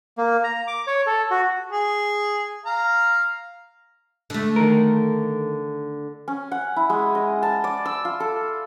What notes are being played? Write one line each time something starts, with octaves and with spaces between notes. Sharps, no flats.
A#3
A#5
D6
C#5
A4
F#4
G#4
F5 A#5
D3 A3
D#3 A#4
C#4
F#5
E4
G#3
D#5
A5
D5
E6
F4
A4